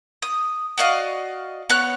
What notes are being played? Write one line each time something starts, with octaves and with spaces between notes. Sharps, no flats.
D#6
F#4 D5 D#5 F5
B3 C#5 F#6